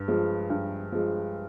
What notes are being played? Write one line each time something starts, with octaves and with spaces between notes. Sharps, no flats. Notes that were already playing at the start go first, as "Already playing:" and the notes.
Already playing: G2
F3 G#3
G2
F3 G#3